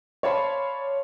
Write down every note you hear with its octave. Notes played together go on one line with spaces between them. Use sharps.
C#5 D5 F5 A5 B5 C6